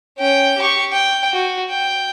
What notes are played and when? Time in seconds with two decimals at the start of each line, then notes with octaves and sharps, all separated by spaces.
0.18 C#4 G5
0.57 G4 C#6
0.92 G5
1.32 F#4
1.70 G5